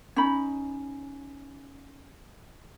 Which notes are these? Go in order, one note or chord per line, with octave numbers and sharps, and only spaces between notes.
C#4 D#4 B5